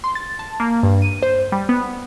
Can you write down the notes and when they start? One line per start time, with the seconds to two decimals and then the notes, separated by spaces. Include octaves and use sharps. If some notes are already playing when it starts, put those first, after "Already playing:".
0.04 C6
0.15 A6
0.39 A5
0.60 A#3
0.83 G2
1.02 D#7
1.22 C5
1.52 G3
1.69 B3